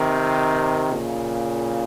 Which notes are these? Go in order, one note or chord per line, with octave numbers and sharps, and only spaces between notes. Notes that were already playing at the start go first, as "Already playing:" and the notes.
Already playing: C3 D#3
A#2 C#3